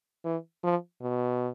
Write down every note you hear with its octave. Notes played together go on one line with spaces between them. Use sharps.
E3
F3
B2